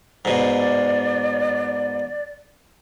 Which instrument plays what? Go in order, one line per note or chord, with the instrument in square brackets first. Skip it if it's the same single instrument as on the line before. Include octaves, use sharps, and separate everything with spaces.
[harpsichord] G#2 B2 [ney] D5